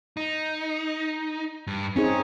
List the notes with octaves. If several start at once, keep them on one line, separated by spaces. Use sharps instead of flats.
D#4
G2
C4 C#4 D#4 G#4